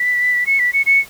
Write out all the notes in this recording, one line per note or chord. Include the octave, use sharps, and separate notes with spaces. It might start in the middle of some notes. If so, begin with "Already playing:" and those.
Already playing: B6
C#7
B6
C#7
C#7